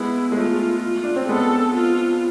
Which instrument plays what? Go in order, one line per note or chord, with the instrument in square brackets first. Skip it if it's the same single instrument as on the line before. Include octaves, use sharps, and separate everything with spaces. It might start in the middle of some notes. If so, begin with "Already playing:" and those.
Already playing: [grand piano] G#3 B3 [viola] E4
[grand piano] G#3
[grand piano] A3 [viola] F4
[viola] F4
[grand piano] D4
C4
[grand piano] G#3 B3 [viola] A4
[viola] F4